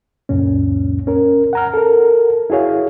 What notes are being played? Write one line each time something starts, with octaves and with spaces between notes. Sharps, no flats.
C#2 F#2 A#2 C#4
C#4 A#4
F#5 A#5 F6
A4 A#4
E4 F#4 G#4 C#5 F5